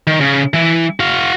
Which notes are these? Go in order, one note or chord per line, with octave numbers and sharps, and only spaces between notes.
D#3
C#3
E3 E4
F#4 F5